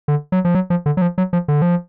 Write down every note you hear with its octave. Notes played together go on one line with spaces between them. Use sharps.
D3
F#3
F3
F#3
F3
D3
F#3
F3
F#3
F3
D3
F3